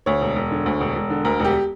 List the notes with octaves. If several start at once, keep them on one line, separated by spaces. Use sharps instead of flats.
D2 C#5
E1
E1
D3
D2
E1
E1
D3
D2 A#4
E1 G4